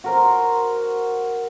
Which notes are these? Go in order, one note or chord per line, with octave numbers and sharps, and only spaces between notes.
F#4 A#4 C5